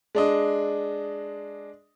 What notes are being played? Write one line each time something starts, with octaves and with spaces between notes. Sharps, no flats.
G#3 D4 D#5